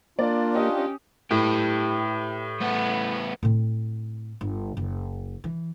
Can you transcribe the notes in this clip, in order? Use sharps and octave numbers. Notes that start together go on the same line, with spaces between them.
A#3 D4 F4 D5
C#4 G4 D#5 D#6
A2 G4 B4
A3 B3
A2 C4
G1
F#1
E3